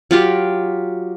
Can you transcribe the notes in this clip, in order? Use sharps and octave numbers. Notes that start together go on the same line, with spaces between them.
F#3 F4 G4